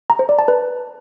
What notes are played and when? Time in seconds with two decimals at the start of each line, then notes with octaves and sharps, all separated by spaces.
0.10 A#5
0.19 C5
0.29 D5
0.39 A5
0.48 B4